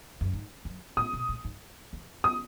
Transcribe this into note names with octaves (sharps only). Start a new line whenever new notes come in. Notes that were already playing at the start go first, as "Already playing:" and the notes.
F#2
G#2
F#2
A2 D#6
B2
A2
G#2
E2
D#6